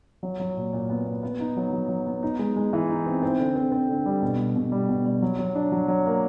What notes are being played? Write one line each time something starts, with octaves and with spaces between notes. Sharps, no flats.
F#3
F#3
A#2
A#2
B3
B3
B3
D#4
F#3
F#3
F#3
B3
D#4
G#3
G#3
E3
D#4
C4
C4
D3
C4
C4
D3
G3
B2
G3
B2
G3
B2
G3
F#3
F#3
D4
F#3
F#3
A#3